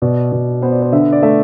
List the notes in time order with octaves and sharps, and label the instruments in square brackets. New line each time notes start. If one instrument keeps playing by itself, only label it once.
[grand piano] B2 D5
B2
B3 C5
D5
C5
D3 E5
D5
A3 E5